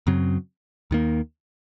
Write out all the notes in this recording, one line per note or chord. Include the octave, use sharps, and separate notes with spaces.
F#2 C#3 F#3 C4
D#2 D#3 A#3